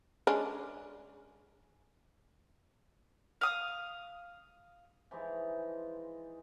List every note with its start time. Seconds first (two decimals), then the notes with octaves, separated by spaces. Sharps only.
0.27 G#3 C#4 D4
3.41 F5 D#6
5.11 E3 F3 G#3 D#4